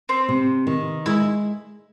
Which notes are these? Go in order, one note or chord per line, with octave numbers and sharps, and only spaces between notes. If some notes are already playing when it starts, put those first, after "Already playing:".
C4
C3
D#3
G#3 E4